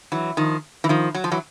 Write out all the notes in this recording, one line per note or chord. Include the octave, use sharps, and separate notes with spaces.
E3 F#3
D#3 F3
E3
D#3 F3
F#3
F3
E3 F#3